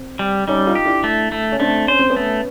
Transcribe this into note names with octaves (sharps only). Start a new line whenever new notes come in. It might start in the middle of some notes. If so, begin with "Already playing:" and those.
Already playing: C4
G3
G3 C#4 D#4
D#4 F4
G4
D4 E4
A3
A3
C#4
A3 C4 D4
C#4 C5
C4
B3 C#4
A3